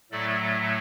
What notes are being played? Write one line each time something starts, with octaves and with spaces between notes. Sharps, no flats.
A2 F#3 A3 A4 D5